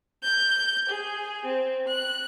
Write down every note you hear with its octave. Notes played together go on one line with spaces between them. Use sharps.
G6
G#4
C4
F#6